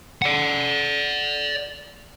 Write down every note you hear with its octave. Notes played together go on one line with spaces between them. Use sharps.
D5 F#5